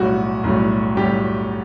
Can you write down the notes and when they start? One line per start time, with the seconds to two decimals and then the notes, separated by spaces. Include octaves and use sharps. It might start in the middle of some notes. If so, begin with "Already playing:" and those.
Already playing: B1 A2 G3 F#4
0.44 B1 A2 G3
0.97 A2 G3 G4